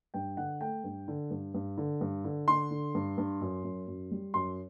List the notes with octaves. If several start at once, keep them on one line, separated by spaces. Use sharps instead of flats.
G2 G5
D3 F#5
A3 G5
G2
D3
G2
G2
D3
G2
D3
D3 C6
D3
G2
G2
F#2
F#2
F#2
G3
F#2 C6